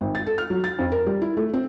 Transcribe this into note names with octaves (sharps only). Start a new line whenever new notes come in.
G#1
A6
A4
F6
F#3
A6
F2
A#4
G3
E4
A3
C4